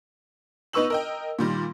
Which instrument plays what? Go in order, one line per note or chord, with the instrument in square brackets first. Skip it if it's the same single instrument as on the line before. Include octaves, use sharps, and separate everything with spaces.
[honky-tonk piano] B3 D#4 B4 C#6 E6 F#7
A#4 D#5 G5
A#2 D#3 G3